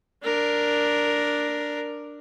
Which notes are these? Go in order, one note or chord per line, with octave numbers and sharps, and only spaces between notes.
D4 A#4